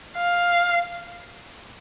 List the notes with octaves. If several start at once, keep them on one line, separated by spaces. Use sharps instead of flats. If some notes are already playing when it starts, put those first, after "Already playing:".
F5